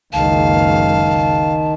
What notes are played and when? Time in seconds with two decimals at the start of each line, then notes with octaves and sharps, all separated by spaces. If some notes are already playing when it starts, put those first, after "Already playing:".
0.13 F#1 C#2 D#3 F5 A5